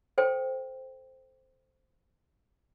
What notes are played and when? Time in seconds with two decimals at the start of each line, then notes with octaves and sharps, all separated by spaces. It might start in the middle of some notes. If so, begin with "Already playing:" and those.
0.18 A4 C5 G5